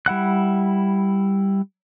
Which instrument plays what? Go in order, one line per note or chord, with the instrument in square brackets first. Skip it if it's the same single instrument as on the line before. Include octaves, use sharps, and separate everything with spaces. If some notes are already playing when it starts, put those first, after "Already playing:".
[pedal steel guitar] G3 E4 F#5 F#6